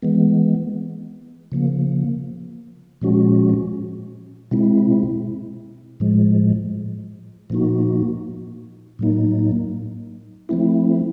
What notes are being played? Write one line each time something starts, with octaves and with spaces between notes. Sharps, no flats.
E3 G#3 B3
C#3 F3 A#3
A#2 F3 G#3 C#4 F#4
B2 G#3 C4 E4
A2 F3 G#3
A#2 F3 A#3 D#4 F#4
A2 F#3 A#3 D#4
F3 A3 C4 E4